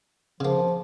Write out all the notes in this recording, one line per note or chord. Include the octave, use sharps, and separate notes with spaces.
C#3 F3 A#3